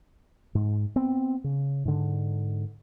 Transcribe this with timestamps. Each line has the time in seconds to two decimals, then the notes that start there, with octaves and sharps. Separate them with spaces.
0.55 G#2
0.96 B3 C4
1.44 C#3
1.85 G#2 D3